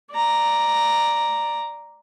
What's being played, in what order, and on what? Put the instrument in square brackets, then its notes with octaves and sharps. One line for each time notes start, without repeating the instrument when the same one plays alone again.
[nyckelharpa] D5 A#5